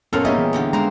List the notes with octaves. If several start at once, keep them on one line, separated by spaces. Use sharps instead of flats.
F#2 A#2 B3 C#4 A4 A#4 C#5 F5
G3 A#3 B3 C#4 D#4 G#4 D#5 E5
E3 B3 G#4
E2 D3 G4
E3 G#3 A#3 C5 A#5